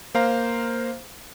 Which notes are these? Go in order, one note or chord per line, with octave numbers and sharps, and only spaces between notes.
A#3 C5 F5 A#5